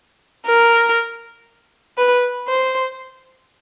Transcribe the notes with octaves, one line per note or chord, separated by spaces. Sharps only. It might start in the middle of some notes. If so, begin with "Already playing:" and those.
A#4
B4
C5